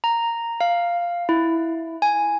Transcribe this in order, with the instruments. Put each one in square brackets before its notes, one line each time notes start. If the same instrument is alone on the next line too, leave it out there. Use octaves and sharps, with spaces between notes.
[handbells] A#5
F5
E4
G#5